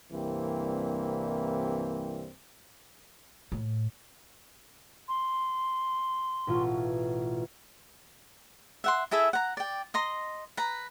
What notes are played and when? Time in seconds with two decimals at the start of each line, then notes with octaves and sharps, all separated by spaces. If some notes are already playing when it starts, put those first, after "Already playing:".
0.12 C2 G2 E3 G3 A#3 C4
3.52 A2
5.08 C6
6.47 A1 B2 F4
8.84 E5 F#5 C6
9.11 E4 G#4 A4 E5
9.33 F#5 A#5
9.57 D5 G5
9.94 D#5 A#5 C6
10.57 B4 A#5